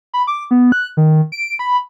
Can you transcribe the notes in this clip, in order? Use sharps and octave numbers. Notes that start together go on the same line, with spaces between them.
B5
D6
B3
F#6
D#3
D7
B5